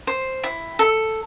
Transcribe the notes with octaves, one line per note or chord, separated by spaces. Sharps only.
C5
E4
A4